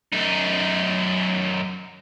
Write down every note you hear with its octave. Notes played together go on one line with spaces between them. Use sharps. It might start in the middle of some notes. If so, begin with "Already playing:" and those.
F#2 D#4